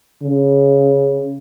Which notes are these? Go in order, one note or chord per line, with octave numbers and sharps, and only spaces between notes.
C#3